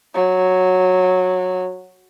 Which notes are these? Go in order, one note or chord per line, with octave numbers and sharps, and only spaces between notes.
F#3